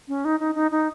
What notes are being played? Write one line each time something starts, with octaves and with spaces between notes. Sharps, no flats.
C#4
D#4
D#4
D#4
D#4